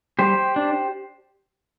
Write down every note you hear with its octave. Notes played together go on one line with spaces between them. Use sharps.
G3 G4 C5
D4